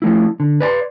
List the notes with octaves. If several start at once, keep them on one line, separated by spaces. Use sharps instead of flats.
F3 A3 E4
D3
B4 D5 A5 C6